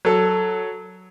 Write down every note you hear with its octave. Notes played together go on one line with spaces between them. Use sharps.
F#3 A4